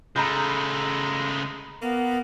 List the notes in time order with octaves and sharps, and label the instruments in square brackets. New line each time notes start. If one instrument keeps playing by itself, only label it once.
[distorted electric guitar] C#3 A3 [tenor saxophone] G#3 [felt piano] A#5 B5 G6
[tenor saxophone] A#3 [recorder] B3